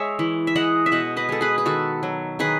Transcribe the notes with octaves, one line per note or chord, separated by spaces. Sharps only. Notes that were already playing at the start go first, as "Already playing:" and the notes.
Already playing: G#3 C#5 E5
E3
E5
G#3 D#5 F#5
E5
B2 D#5 F#5
B4 D#5
G#3 A4
G#4 B4
B4
D#3 F#4 A4
F#3
D#3 G#4 B4